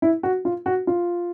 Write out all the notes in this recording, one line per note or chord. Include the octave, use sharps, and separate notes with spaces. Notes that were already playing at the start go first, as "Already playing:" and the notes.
E4
F#4
F4
F#4
F4